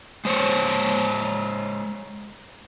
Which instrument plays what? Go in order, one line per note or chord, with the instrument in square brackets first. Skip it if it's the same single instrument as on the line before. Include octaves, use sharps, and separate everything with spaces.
[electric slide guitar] G#3 C5 C#5